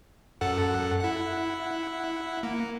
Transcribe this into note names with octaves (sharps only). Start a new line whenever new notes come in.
F#2 A4 F#5
E4 F#5
A#3